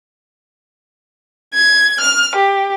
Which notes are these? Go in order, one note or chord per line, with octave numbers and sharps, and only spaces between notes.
G#6
F6
G4